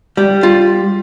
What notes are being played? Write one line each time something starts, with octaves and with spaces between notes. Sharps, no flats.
G3
F4